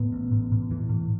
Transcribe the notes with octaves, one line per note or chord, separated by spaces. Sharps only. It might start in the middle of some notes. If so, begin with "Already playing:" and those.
Already playing: A2 B3
A1
A2
A2
A2 E3
A2